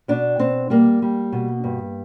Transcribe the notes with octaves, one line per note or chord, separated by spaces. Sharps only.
B2 D4
B2 C4
G3 A#3
G3
B2
G2